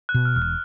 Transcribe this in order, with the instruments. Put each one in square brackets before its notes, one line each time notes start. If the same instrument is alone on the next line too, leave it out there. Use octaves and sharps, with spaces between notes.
[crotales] F#6
[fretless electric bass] B2
[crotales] F6
[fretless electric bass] E1 [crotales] F6
[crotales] F#6